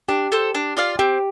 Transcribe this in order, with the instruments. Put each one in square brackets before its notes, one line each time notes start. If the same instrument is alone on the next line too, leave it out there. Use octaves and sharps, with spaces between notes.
[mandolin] D4 [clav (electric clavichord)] G4
[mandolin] A4 C5
D4
F4 D5 F5
[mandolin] C4 [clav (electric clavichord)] G4